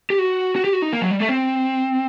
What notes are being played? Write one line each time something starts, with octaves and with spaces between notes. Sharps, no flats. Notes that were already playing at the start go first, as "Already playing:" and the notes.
G4
F#4
F#4
G4
F#4
D#4
A#3
F#3
G3
A3
C4